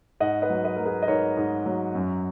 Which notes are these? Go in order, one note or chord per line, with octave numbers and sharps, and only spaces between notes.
G#2 D#5 F#5
B4 D#5
F#3
B4 D#5
F#3 A#4
G#4 B4
D#5
G#2 A#4 C#5
G#2
F#3
F#2